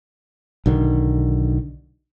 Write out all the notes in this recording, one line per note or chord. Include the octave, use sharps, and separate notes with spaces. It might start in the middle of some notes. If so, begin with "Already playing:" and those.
B1 D3 D#3